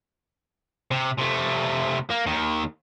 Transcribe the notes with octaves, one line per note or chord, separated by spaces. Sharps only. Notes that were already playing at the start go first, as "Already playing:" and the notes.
C3
C3 A3
A#3
D#2 D#3